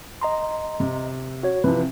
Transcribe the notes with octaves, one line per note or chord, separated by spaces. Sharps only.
D#5 A#5 C6
C3
F#4 C#5
C3 E3 F3 B4